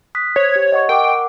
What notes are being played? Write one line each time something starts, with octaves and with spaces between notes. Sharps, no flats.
D#6 F#6 B6
C5 C#5
G4
D#5 F#5 C#6
A#4 F#5 G5 D6